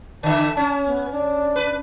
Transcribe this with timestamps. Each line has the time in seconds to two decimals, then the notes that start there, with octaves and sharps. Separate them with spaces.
0.23 D3 E3 E5 A5
0.57 C#4
0.86 B3
1.11 D4
1.56 B4